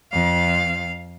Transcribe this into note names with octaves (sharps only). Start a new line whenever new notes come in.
F2 F5